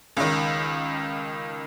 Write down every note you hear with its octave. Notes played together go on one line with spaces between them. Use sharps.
C#2 D#3